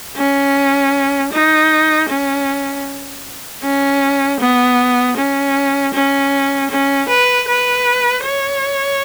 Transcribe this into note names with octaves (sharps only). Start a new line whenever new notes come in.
C#4
D#4
C#4
C#4
B3
C#4
C#4
C#4
B4
B4
C#5